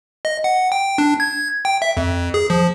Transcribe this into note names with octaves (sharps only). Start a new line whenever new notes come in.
D#5
F#5
G5
D4
G#6
G5
E5
F2
G#4
F3